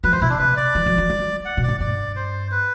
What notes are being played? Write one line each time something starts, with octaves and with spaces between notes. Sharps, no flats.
F#3 B4
E3 C5
B2 E4
C3 D4
B4
D5
E3
F#3
F#3
G3
F#5
B2
D5
A2
G2 D5
C5
B4